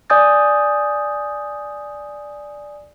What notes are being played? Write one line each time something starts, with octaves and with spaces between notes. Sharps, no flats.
D5 G#5 D#6 G6 A6